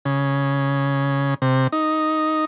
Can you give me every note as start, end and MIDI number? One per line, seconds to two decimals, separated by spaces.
0.05 1.34 49
1.42 1.67 48
1.72 2.45 63